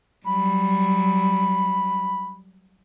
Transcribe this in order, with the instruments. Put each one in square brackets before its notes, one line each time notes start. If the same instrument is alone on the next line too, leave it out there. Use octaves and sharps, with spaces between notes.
[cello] F#3 G3 [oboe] B5